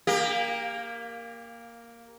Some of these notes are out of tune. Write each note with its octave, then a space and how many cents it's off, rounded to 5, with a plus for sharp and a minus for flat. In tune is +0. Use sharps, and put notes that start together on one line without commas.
A#3 +0 G4 +30